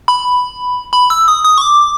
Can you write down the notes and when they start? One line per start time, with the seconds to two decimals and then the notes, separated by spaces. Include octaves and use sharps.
0.08 B5
0.93 B5
1.10 E6
1.28 D#6
1.45 D#6
1.58 C#6
1.61 D6